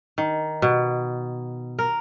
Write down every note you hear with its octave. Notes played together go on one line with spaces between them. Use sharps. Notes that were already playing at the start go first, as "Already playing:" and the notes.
D#3
B2
A#4